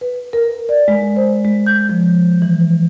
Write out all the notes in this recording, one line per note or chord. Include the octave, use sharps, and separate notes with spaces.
B4
A#4
D5
G#3
C5
G#3
G6
F3
E3